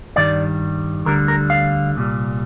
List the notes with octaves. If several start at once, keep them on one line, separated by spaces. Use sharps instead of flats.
G2 D#3 G3 D5
D2 D3 G3 A#4
A#4
F5
C2 A#2 G3